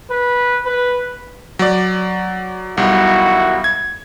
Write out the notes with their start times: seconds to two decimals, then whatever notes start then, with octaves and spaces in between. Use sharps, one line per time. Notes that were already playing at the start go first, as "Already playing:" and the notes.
0.10 B4
0.66 B4
1.59 F#3 D5
2.77 B1 D#3 G3 E4 F#4
3.64 G#6